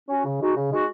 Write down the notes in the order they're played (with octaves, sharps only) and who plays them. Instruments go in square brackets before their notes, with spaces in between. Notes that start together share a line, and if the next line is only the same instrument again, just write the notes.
[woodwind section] C#4 F#4
C#3
G#3 D#4 F#4
C#3
G#3 D#4 F#4